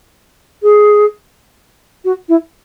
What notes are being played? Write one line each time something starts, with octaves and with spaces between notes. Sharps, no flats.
G#4
F#4
E4